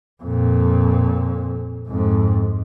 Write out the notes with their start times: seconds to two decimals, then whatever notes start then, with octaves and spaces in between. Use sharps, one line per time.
0.23 F2 A#2
1.88 F2 G#2